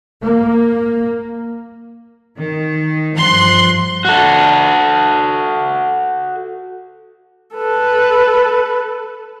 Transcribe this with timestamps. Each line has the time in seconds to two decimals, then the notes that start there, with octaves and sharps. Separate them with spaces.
0.22 A#3
2.38 D#3
3.16 G2 F3 C6 F#6
4.05 F#4 A4
7.55 A4 B4